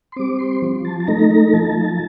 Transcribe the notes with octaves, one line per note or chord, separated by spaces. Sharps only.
C6
G3 C4 D6
C6
F3
A5
A5
A3 D#4 A#5
A#5
F3 A5